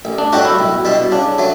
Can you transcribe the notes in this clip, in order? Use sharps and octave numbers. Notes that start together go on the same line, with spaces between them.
A1
D4
A2 G3 D4 F#4 G4
E4
B1
B2 G3 D4
C#3 D4
F#3 A3